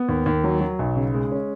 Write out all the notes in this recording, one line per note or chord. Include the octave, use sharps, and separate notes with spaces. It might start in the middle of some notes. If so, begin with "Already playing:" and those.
Already playing: B3
D#2
D#2
F#3
F#3
B1
C#3
G#3
C#4